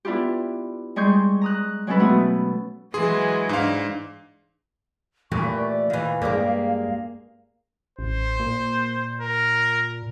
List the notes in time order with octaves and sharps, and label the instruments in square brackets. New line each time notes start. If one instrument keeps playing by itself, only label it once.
[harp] B3 D4 E4 F4 G4
G3 G#3 G#4 C6 C#6 G6
A#5 D#6 F#6
F#3 G#3 C4 C#4 A4 B4
B2 A3 B3 F#4 D#6
[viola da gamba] E3 F#3 G#3 [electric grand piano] G#4 C6
[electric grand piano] G#2 F5 [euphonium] D4
[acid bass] A#2 [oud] E3 [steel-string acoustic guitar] A3 G4 [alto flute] C#6
[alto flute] D5
[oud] D#3 E3 [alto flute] F5
[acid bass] G2 [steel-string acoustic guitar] G#3 G#4 D5 [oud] A#3 G4 C#5
[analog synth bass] A1 [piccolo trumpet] C5
[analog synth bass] A#2
[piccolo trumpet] A#4